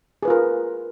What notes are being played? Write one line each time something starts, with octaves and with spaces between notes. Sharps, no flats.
F4 G#4 A#4 B4